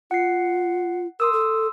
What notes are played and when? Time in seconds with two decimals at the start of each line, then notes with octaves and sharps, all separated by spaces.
0.11 F4 F#5 C7
1.20 A#4 C6 D#6 E6
1.33 A4